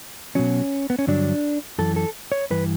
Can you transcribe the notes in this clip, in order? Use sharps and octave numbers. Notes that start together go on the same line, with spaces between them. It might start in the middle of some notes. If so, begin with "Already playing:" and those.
B2 F#3 C#4
B3
C#4
G2 D3 F#3 D4
F#2 E3 A4
A4
C#5
G2 E3 B4